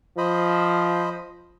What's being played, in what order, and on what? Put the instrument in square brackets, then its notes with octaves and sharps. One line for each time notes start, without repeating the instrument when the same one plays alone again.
[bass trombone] F3 [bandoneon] C5 D#5 B5